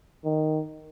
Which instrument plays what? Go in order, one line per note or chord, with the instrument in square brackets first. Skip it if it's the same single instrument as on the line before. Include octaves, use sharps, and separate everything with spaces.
[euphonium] D#3